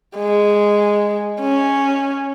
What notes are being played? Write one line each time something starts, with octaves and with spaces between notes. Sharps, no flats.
G#3
C#4